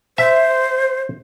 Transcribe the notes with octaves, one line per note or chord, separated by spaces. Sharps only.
C5 E5